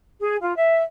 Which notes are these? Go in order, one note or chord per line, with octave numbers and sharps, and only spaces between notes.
G#4
F4
E5